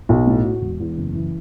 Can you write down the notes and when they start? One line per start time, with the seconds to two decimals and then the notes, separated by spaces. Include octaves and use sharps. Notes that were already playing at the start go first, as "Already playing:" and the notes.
0.09 B1
0.27 A2
0.44 F#4
0.61 E1
0.80 E2
0.97 F#1
1.14 E3